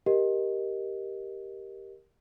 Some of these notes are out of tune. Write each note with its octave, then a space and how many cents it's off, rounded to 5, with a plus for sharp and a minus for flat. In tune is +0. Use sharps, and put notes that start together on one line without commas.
G4 +0 A#4 +5 D#5 +0